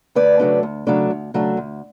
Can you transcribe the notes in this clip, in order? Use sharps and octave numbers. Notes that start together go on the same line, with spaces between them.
D2 B4 D5
C#3 F#3 A3 D4
D2
C#3 F#3 A3 D4
D2
C#3 F#3 A3 D4
D2